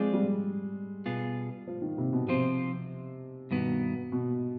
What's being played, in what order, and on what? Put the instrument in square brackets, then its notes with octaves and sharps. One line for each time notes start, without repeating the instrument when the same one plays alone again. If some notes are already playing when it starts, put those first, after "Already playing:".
Already playing: [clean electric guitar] F3 C4 F4 G#4 D5 [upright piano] G#3
[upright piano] G3
[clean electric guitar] B2 B3 F4 G#4
[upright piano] F3
D#3
C3
B2
[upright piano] C3 [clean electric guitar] F3 C4 F4 C5
[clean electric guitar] G2 D#3 B3 [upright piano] B2
[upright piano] B2